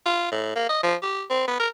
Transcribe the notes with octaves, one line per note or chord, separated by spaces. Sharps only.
F4
A2
A#3
D#5
F3
G4
C4
B3
A#4